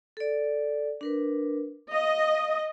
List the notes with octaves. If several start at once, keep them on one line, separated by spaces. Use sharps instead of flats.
A4 D5
D4 A#4 B4
D#5 F5